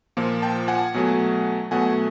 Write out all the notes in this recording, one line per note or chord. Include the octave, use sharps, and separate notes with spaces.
A#2 F3 A#3
G5 A5
F#5 G#5
B2 F#3 A3
B2 F#3 A3 F#5 G#5